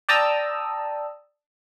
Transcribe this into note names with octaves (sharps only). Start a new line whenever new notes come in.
D5 G5 A5 A#5 D#6 E6